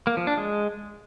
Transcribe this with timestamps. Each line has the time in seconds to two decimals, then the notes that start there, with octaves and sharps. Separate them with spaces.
0.07 A#3
0.17 F3
0.27 D4
0.37 G#3